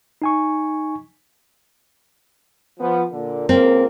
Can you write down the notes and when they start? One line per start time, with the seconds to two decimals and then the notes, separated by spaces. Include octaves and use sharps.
0.22 D#4 G#5 C#6
2.80 F3 B3
3.11 A#2 D3
3.49 C#2 A#3 C4 A#4